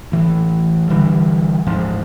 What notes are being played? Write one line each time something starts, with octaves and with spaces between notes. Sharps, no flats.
A1 E3
D3 E3 G3
D1 G#1 G#2 F3